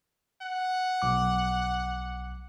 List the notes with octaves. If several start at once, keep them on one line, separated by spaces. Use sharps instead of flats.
F#5
B1 D6